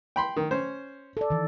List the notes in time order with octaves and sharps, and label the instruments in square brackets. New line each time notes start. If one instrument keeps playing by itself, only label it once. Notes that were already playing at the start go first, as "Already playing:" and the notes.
[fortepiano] G5 B5 C6
D#3
C#4 C5
[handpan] A4 D5
D#3 E3